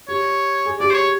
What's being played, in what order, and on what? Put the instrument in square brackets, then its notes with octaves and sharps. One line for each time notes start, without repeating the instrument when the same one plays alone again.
[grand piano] G4 [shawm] C#5
[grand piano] G#4
[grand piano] G4 [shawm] D5
[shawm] C5
C#5